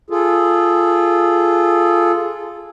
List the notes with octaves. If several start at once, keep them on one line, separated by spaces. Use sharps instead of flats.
F4 G#4 A4